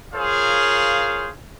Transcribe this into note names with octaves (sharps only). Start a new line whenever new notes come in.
F4 G#4 A#4 C5 C#5 F5